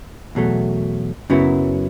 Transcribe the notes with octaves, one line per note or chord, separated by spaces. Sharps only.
E2 B2 F#3 A3
F#2 C#3 F#3 B3 E4